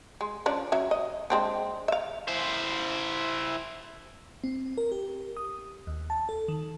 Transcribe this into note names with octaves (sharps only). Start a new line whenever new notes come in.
G#3
F3 C#4 D4
F#3 C#4 E5
D#5
G#3 C4 D4
E5 F5
E4 C5
C4
A#4
G4
D#6
D#2
A5
A4
D#3